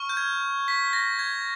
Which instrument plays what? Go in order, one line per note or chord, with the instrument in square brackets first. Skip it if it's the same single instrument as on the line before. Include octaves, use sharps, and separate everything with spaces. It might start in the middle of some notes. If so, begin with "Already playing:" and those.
Already playing: [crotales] C#6 F6
G6
G#6
B6
A#6
G#6